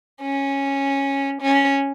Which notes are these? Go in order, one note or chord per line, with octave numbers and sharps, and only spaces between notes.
C#4
C#4